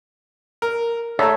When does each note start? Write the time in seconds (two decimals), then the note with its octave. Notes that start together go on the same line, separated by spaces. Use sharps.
0.62 A#4
1.19 A3 A4 C#5 E5 A#5